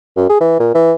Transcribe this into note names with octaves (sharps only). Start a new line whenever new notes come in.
F#2
G#4
E3
A#2
E3